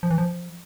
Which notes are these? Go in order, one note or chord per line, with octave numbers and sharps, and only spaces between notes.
F3
E3
F3